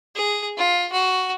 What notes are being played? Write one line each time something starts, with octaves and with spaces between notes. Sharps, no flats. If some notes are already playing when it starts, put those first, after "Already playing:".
G#4
F4
F#4